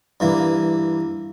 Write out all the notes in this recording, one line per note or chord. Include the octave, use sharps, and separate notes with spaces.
G2 E3 A#3